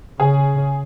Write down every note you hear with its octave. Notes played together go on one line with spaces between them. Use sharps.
C#3 G#4